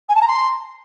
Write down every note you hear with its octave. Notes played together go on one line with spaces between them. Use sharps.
G#5
A5
A#5
C6